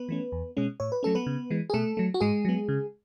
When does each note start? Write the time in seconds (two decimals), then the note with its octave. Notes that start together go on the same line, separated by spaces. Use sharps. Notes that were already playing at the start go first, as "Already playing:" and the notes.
Already playing: B3 B4
0.09 E3 A3 C#4
0.32 E2
0.57 B2 G#3 C#4
0.80 A2 C#5
0.92 B4
1.03 F#3 A3 C#4 A4
1.15 B3 B4
1.27 C#3
1.50 E3 G#3
1.70 G#4
1.73 B2 A3 A4
1.97 F#3 A3
2.14 F#4
2.20 G#2 G#3 G#4
2.45 F#3 B3
2.69 C#3